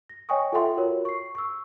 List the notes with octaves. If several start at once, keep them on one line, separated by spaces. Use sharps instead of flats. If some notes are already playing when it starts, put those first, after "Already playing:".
A#6
C#5 D#5 G5 G#5 C#6 D#6
F4 A4 E5 F#5 G5 C6
F4 F#4 A#4 C#5
C#6 C7
C#6 E6